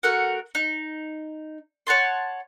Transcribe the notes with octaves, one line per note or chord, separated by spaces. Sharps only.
A3 F#4 A#4 F#5
D#4
C#5 F#5 A5 C6